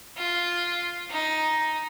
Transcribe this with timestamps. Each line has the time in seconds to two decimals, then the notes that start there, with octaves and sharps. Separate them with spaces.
0.17 F4
1.11 D#4